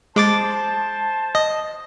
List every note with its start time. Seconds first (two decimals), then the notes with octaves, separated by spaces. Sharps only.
0.16 G#3 C5 A5 D6 A6
1.35 D#5